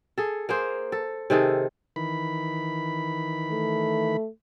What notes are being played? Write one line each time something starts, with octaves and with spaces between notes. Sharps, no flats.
G#4 A4
A#3 G#4 C5
A4
C3 D#3 G#4 A4
D#3 E3 B5
A3